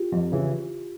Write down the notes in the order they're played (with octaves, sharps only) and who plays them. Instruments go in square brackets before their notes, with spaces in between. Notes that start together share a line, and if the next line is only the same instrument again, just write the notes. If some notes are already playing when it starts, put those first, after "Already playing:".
Already playing: [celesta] F4 G4
[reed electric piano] F2
C#3 E3